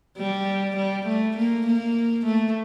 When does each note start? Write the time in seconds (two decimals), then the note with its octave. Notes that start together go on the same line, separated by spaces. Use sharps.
0.18 G3
0.76 G3
1.06 A3
1.37 A#3
1.67 A#3
2.25 A3